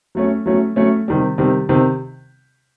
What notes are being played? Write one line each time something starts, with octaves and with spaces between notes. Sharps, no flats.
F#3 A3 C#4
F#3 A3 C#4
F#3 A3 C#4
C3 D#3 G3
C3 D#3 G3
C3 D#3